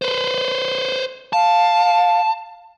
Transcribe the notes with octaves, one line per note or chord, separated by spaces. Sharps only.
B4 C5
F5 A5